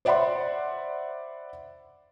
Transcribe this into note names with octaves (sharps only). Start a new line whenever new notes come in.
C5 D5 E5 F#5 B5 C6